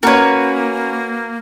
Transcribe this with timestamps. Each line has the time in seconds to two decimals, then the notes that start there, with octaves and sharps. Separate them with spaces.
0.03 A#3 C#4 F#4 A#4 B4 C#5